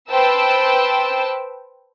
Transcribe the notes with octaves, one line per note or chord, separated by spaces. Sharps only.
B4 C5 G5 A5 E6